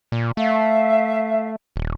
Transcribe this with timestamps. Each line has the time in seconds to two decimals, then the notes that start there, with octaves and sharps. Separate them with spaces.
0.12 A#2
0.37 A3 E5 F5
1.76 D#1